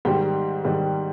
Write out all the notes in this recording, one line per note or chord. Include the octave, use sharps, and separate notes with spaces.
G#2 D#3 G3 G5
G#2 D#3 G3